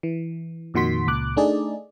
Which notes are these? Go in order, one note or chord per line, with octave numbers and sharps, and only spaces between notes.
E3
F2 A#2 D#3 F#4 C6 B6
C#2 A#2 D6 F#6
A3 D4 D#4 G#4 D5